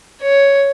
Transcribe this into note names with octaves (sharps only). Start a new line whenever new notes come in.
C#5